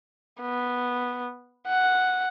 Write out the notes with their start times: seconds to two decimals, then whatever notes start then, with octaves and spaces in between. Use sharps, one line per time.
0.41 B3
1.68 F#5